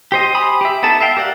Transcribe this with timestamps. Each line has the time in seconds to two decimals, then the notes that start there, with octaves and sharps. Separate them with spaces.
0.12 G4 C5 D#5
0.35 G4 C5 G#5 B5 D#6
0.61 G4 E5
0.83 B3 D#4 E4 A4 A5
1.01 E5 F5 G5
1.17 G4 A#4 D5 F#5